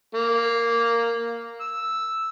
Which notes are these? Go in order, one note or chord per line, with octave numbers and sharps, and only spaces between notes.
A#3
E6